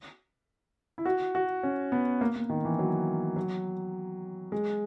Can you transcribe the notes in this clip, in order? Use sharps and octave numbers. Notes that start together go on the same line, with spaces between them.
E4
F#4
F#4
C#4
B3
A#3
A#3
D#3
E3
F#3
F#3
G#3